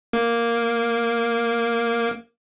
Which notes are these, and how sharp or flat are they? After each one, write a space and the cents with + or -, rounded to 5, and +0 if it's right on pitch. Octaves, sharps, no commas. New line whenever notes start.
A#3 +0